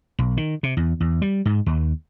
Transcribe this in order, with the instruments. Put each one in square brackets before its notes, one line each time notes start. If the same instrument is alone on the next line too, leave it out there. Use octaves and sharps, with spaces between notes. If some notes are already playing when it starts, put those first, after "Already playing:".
[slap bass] B1
D#3
C3
E2
E2
G3
G#2
D#2